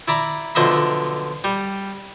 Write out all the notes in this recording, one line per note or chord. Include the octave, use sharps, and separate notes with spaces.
E4 D5 A#5 B5
B1 D3 F3 D#5 E5 B5
G3